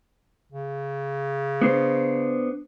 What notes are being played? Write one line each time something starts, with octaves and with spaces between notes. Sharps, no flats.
C#3
B3 D4 C5